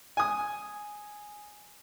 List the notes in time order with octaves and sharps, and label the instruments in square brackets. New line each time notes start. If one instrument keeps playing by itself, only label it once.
[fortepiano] G#5 D#6